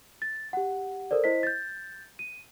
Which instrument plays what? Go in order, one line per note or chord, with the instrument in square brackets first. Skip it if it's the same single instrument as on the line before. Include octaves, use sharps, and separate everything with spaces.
[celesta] A6
G4 F#5
A4 A#4 C5 D5
E4 C5 D#5 B6
G6 A6
D#7